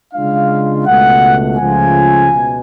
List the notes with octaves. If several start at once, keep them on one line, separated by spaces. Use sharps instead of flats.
C#3 G#3 D4 F4 F5
C#2 B2 A3 F#5
C#2 C#3 F3 A3 F4 G#5
B2